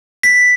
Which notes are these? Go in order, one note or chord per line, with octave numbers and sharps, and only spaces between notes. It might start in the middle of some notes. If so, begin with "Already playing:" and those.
B6